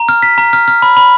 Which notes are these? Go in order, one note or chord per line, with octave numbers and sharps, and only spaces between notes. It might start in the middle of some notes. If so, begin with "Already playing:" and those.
Already playing: A#5
F6
B6
A#5
F6
F6
B5
B5